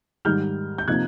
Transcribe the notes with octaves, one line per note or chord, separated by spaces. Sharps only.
G#2 D#3 G3 F6 G6
G6
C3 F3 A#3 D#4 F#6 G#6